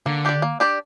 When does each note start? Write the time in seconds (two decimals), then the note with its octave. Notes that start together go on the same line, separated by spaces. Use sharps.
0.06 D3 A#3
0.25 D4 G4 D5
0.42 A#3
0.60 D4 G4 D5